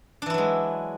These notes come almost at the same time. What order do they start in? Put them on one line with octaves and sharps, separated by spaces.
D4 E3 E4 F#3 G#3